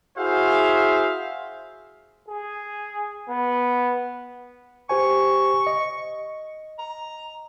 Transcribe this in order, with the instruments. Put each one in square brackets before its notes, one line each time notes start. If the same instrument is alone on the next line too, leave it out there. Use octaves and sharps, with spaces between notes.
[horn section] E4 F#4 G#4 C5 E5 F5
[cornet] G#4
B3
[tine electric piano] G4 C5 G#5 [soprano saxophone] C#6
[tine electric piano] D#5
[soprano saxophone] A#5